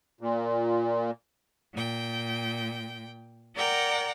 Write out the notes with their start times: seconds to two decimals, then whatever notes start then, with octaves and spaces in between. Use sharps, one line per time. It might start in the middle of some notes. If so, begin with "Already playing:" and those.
0.21 A#2
1.74 A#2 G5
3.56 A#4 D5 F#5 G5 A#5